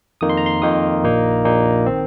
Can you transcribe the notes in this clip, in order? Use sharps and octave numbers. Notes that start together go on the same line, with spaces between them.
F2 D#3 A#3 D#4 D#6
C6
A#5
C6
F2 D#3 A#3 D#4 D#6
A#1 A#2 A#3 D#4
A#1 A#2 A#3 D#4
D#3 C4